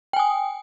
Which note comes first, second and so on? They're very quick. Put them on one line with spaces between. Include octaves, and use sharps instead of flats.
G5 G#5 D#6